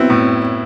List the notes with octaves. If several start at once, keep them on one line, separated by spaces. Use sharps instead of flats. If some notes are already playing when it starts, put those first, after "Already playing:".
Already playing: F#3 B3 C4 E4
A2